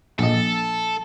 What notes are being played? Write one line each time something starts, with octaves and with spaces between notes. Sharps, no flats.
A#1 A4 D#5